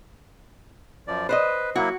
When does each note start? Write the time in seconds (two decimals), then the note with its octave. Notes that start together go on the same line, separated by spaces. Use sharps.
1.07 F#2 F3 D5
1.29 B4 C5 D5 D#5
1.76 F#3 A#3 E4 F#4